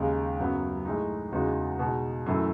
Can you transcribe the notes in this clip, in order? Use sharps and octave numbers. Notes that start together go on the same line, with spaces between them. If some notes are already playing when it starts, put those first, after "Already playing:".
Already playing: D#2 C#3 G#3 D#4
F#2 C#3 F#3 B3
A2 G#3 D#4
E2 C#3 G#3 D#4 F#4
B2 G#3 D#4
F#2 E3 A3 E4